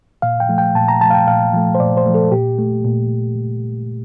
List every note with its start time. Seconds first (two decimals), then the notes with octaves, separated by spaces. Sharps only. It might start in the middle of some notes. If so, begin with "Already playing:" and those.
0.22 A#2 F5
0.40 G5
0.49 F3 A3
0.58 G5
0.75 A#2 A5
0.88 A#5
1.01 F3 A3 A5
1.10 F5
1.14 G5
1.27 A#2 F5
1.53 F3 A3
1.75 C5
1.80 A#2 D5
1.97 C5
2.06 F3 A3
2.15 A4
2.32 A#2 G4
2.58 A3
2.84 A#2